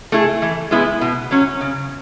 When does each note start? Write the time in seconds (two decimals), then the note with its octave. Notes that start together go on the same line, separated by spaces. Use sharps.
0.12 A3 E4 G#4
0.42 E3
0.71 G#3 B3 E4
1.01 B2
1.31 F#3 C#4
1.61 C#3